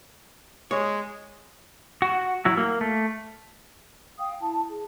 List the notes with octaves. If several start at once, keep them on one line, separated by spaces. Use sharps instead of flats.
G#3 C#5
F#4
F#3 E4 F#4
A#3
A3
F5 G5 D#6
E4 A5
G#4